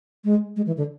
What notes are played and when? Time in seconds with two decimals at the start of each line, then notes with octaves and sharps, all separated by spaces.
0.25 G#3
0.56 G#3
0.67 E3
0.77 D3